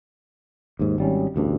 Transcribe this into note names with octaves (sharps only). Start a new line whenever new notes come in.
D#2 G#2
G#1 G3 C#4
A1 D2 G2